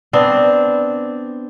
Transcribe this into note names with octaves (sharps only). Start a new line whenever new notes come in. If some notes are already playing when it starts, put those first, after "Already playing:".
B3 C4 D4